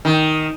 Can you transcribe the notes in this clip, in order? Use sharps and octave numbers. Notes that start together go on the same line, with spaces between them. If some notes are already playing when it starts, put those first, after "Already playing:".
D#3